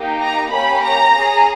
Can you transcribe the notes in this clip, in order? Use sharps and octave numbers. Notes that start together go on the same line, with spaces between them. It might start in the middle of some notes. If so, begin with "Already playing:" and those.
Already playing: A#3 D#4 G4
A#5
A#3 C#4 G4 B5
A#5
C#4 G#4